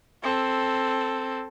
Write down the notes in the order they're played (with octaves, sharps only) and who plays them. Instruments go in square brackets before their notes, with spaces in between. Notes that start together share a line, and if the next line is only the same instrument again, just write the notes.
[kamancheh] C4 A4